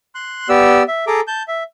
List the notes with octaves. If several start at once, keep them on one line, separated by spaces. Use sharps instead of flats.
C6 F#6
B3 G4 D5 E6
E5
G#4 A4 A#5 D6
A5 G6
E5